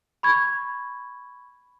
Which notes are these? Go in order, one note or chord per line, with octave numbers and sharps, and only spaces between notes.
B5 C#6 G#6